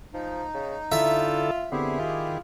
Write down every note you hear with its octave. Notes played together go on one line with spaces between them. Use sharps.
F3 D#4
C#3
D3 E4 F4 A4 E5
D3 B3 C4 E4 G4 G#4
D#3 F4